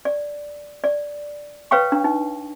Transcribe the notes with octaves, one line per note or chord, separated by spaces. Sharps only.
D5
D5
B4 C#5 F5 G5 C#6
D4
D#4